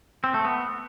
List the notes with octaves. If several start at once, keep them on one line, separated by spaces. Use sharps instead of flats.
C4
A3
B3